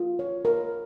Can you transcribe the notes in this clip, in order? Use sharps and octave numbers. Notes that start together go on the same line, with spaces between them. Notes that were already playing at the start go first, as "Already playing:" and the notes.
Already playing: F4
C#5
A#4